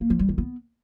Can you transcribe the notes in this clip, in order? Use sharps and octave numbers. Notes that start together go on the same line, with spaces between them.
A#3
F3
G3
D#3
B3